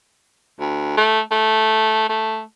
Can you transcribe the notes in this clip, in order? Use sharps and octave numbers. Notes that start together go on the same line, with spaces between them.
D2
A3
A3
A3